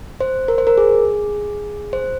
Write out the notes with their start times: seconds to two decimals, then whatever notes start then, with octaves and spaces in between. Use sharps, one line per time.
0.21 C5
0.48 A#4
0.58 C5
0.67 A#4
0.78 G#4
1.93 C5